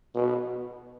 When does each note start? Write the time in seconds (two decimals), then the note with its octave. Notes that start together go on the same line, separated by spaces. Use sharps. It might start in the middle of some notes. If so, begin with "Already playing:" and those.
0.15 B2